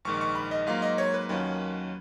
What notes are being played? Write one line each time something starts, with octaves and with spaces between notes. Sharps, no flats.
A#1 G#2 D#3 C#6
C#6
B5
D#5
G#2 F#3 A#3 F4 F5
D#5
C#5
B4
D#2 D#3 F#3 C#4 F4 B4